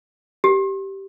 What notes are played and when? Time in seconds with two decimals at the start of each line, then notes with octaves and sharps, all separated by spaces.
0.44 G4